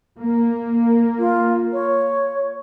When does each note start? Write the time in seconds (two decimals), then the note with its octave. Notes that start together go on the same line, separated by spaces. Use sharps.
0.19 A#3
1.19 F4
1.73 C#5